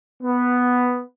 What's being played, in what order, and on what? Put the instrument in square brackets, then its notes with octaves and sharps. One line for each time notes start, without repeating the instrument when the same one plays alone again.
[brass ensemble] B3